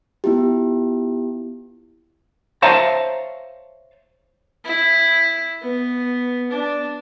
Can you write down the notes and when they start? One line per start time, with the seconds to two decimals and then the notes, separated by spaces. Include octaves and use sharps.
0.24 B3 E4 F4 G4
2.62 C5 C#5 E5 F5 A5 A#5
4.65 E4
5.61 B3
6.52 D4